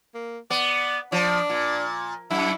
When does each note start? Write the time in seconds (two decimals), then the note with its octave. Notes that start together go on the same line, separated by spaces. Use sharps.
0.14 A#3
0.50 B3 D5
1.12 F3 D4
1.50 A#2
2.30 F#2 E4